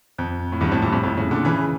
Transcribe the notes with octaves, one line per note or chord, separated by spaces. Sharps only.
F2
A2
E2 G2
F2 A2
G2 A#2
F2 A2
F2 A2
A2 C#3
A#2 D3
C#3 E3